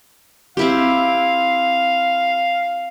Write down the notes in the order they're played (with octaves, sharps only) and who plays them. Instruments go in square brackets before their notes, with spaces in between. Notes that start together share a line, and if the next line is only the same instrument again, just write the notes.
[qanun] C4 E4 G4 [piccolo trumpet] F5